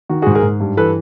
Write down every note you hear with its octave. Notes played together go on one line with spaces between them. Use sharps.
D#3 F#4
F#4 G#4
G#2
G#4 A#4
G#2
G2
E3 A4 B4